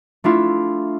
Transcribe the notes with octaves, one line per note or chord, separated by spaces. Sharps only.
A3 D4 E4 F4